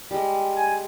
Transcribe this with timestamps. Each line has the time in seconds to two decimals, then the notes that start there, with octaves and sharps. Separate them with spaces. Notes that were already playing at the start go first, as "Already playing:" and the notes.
0.11 G3 G#3
0.56 G#5